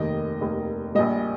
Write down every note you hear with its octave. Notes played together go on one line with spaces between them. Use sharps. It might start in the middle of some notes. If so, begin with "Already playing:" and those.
Already playing: F1 D#2 D#3 D#5
F1 D#2 D#3
A#1 A#2 G3 D#5